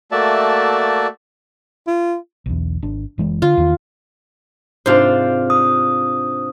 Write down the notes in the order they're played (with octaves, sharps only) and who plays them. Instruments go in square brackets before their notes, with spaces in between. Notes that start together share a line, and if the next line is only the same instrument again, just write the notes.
[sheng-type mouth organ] A3 A#3 F#4 D5 E5 A5
[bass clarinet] F4
[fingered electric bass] B1 E2
G#1 D4
F#1 E3 G#3
[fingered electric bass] D3 [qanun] F4
[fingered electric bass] E2 D#3
[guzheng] G#2 C3 [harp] D4 F4 C5
[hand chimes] D#6